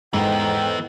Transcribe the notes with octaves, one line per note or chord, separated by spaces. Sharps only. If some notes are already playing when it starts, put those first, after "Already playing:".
G#2 E3 B3 A4 C5 D#5 G5